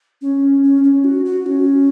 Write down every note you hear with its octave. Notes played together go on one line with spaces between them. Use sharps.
C#4
C#4
C#4
F#4
F#4
C#4